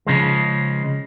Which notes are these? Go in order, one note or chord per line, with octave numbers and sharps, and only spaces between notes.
C#3 F3 G#3